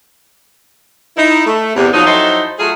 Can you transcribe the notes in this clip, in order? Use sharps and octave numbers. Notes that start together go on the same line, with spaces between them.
D#4 E4
A3
E2 C3
F3 F#3 D#4
F2 F#3 D#4 E4 A4 C5
F#3 A3 F4 G#4